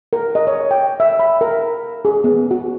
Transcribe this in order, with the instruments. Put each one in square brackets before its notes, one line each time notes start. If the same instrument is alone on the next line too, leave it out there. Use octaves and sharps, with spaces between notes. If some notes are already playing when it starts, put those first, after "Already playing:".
[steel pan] A#4
D#5
C#5
G5
E5
B5
A#4
G#4
B3
F#4